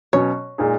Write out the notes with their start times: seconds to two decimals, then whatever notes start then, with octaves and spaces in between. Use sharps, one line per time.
0.13 B2 F#3 C#4 C#5
0.58 A#2 G#3 D#4 G#4